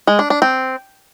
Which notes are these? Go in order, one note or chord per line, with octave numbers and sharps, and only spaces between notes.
G#3
D4
D4
C4